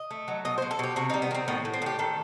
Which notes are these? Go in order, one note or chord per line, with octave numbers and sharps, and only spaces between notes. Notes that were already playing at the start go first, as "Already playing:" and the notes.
Already playing: D#5
A3
F#3
B2 D#5
C5
B2
A4
B2 G4
C3 F#4
D#4
G3
B3
D#3 C4
A2 B3
A2
C4
A2 G4
D#3 A4